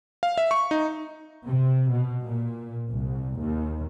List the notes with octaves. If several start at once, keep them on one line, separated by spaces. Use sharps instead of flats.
F5
E5
C#6
D#4
C3
B2
A#2
C2
D#2